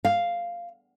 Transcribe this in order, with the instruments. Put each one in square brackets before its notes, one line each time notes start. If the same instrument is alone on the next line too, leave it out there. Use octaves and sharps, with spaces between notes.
[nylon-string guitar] F5